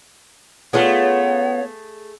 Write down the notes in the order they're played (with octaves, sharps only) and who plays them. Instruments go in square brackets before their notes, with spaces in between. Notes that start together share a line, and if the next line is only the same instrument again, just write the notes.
[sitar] A3 G#4 [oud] B3 C#4 F4 [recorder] C#5 [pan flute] F#5